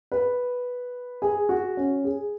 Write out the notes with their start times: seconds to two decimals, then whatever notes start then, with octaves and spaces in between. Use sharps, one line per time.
0.12 B4
1.22 G#4
1.49 F#4
1.77 C#4
2.04 G#4